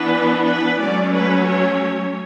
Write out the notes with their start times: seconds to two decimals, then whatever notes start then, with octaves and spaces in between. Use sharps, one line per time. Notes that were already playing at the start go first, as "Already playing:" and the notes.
Already playing: E3 B3 D4 B4
0.44 B4
0.78 F#3 A3 C#4 D5
1.12 B4
1.47 C#5